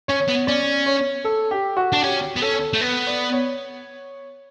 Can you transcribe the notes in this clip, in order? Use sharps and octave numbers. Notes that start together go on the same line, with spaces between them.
C#4 C#5
B3
C#4 D5
C#5
A4
G4
F#4
D4
C#4 G4
B3
C#4 A4
A3
B3 B4
D5
C#5